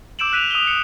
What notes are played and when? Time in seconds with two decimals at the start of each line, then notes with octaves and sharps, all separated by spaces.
0.19 D6 E6 G6 D7 E7 F#7
0.33 F#6 B6 D#7 F7
0.51 D#6 D#7 F7 G7
0.67 C#7